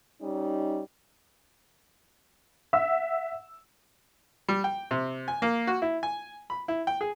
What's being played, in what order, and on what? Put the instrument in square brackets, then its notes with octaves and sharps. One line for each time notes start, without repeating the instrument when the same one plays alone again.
[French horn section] G3 C#4 D#4
[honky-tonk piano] E5 F#5 E6
[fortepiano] G3
G5
C3
G#5
A#3
F#4
E4
G#5
B5
E4
G5
G#4